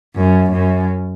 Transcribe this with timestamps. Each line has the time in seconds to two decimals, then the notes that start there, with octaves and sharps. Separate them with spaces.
0.16 F#2
0.52 F#2